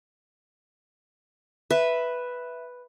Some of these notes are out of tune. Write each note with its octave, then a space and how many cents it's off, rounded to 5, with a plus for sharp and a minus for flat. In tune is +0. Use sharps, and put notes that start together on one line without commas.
B4 +0 E5 +0